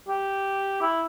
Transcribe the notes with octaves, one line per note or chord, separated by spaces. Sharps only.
G4
E4